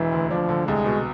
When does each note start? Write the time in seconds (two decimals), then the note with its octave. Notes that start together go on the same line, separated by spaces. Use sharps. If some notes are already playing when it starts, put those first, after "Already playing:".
Already playing: E1 E3 G#3
0.12 D2
0.31 F3 D4
0.49 D3
0.67 C2 G#3
0.86 B2